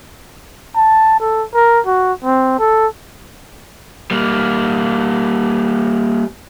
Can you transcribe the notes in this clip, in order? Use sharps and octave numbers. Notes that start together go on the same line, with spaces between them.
A5
A4
A#4
F#4
C4
A4
G3 A#3